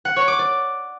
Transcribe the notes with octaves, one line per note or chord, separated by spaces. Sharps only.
F#5
C#5
D6
D5